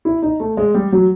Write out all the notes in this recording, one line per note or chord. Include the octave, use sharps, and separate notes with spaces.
E4
D#4
A3
G#3
G3
F#3